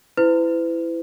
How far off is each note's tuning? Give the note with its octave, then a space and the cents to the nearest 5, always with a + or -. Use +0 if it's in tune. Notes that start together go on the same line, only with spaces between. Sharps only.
E4 +10 B4 +45